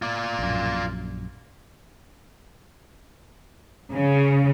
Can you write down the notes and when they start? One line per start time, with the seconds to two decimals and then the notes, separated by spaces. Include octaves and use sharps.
0.02 F4 D5
0.39 A#1 F#2
3.93 C#3